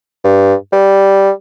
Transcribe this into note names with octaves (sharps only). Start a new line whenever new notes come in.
G2
G3